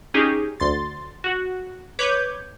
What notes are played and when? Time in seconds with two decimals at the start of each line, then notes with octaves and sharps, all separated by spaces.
0.14 C#4 D#4 G4 G#4
0.60 D2 C6 A6
1.24 F#4
1.99 B4 C#5 D6 G6 G#6